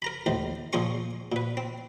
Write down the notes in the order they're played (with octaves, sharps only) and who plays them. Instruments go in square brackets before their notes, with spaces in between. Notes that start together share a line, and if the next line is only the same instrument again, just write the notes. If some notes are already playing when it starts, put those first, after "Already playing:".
[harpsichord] A#4 A#5 B5
D#2 A2 E3 C5
A#2 F3 A#3 G#4 C6 C#6
A#2 B4
C4